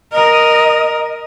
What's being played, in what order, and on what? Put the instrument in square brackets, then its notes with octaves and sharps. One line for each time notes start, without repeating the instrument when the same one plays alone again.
[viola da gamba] A#4 [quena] D#5